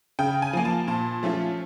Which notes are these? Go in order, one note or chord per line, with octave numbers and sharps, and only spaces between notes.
C#3 G5
G#5
F3 A#3
A5
A#2 A5
F3 A3 C#4 F4